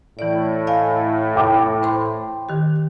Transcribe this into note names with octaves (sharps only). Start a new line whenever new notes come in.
A2 E3 D5
D#5 F5 G#5
G5 D6
C5 B5 C6
D#3 G4